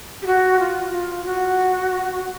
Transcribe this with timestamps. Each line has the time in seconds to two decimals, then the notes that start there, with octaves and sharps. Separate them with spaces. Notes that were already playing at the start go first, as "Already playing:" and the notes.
0.22 G4
0.26 F#4
0.59 F4
0.92 F4
1.25 F#4